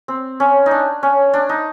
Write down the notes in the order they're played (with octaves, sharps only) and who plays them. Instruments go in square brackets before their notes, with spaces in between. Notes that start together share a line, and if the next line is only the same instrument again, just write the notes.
[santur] C4
C#4
D#4
D4
C#4
D4
D#4